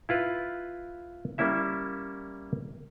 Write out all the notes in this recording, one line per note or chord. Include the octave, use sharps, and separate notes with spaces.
E4 F4 B4
G3 A#3 C#4 E4 E5